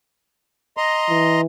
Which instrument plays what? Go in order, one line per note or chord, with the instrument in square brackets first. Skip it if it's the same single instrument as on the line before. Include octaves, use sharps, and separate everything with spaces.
[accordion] D#5 A#5 C6
[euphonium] E3